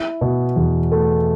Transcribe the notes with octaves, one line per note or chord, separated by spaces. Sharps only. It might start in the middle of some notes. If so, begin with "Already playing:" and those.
Already playing: E4
B2
E2
A3